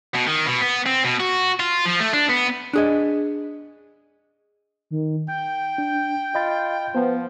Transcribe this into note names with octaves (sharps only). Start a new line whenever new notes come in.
B2
D#3
B2
B3
C4
B2
F#4
F4
F3
A3
D4
B3
D4 G#4 D#5
D#3
G5 G6
D4
F4 D#5 B5 A6
F3 B3 C5